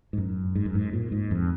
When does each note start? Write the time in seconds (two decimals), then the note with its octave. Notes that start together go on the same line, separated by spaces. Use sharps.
0.13 G#2
0.18 F#2
0.55 G#2
0.65 F#2
0.75 G#2
0.93 A#2
1.12 G#2
1.31 F2